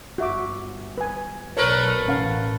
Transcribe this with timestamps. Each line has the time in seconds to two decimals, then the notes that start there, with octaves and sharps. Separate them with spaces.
0.18 G1 F#4 E5 D6
0.98 B4 G#5
1.57 B1 A3 A#4 B4 C#5
2.08 A1 C#4 F5 F#5